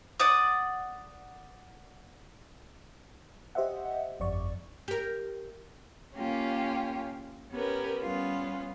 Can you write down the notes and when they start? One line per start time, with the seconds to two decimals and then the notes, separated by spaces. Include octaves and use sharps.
0.20 D5 F#5 D#6
3.55 G4 C5 D#5 E5 F#5
4.20 G1 F2 D5 C#6
4.88 G4 A#4
6.16 A#3 C#4 F4 G4
7.52 B3 C#4 G4 A#4 B4
8.01 G3 B3 C#4 F4